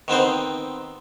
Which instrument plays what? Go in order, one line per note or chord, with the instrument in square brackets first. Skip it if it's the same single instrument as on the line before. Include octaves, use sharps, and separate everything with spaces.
[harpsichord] D#3 B3 C4 C5